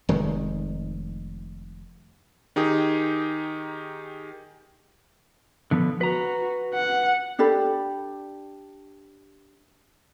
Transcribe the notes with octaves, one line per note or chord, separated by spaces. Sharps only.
F1 D#3 G#3
D#3 D#4 G4 G#4
D3 F3 B3
F#4 B4 A#5
F#5
D4 G4 A4 B5